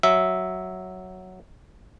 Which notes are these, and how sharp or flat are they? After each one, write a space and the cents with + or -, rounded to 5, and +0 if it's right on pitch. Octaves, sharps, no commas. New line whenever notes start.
F#3 +0 E5 -10